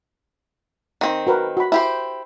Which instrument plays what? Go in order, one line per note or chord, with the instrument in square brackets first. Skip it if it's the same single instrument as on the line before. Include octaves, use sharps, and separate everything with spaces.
[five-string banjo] D#3 C4
[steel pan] F#4 A#4 B4
F#4 B5
[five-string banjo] E4 G4 C5